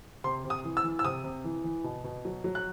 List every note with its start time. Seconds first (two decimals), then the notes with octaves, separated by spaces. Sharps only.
0.24 C3 C6
0.44 C3
0.50 D#6
0.64 E3
0.77 E6
0.84 E3
0.99 E6
1.05 C3 D#6
1.24 C3
1.44 E3
1.64 E3
1.84 B2
2.04 B2
2.25 F#3
2.44 F#3
2.55 F#6